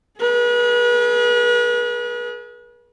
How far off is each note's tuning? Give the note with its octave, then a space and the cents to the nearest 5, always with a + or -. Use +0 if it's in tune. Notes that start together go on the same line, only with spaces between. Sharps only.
G#4 +35 B4 -40